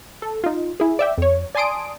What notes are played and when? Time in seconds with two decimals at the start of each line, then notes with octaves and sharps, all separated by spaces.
0.22 A4
0.44 D#4 F4
0.80 E4 G#4
0.99 D5 E5 G5
1.18 F2 C#5
1.55 D5 G#5 A5 C6 D#6 D7